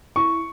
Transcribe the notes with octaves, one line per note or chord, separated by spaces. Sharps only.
E4 C#6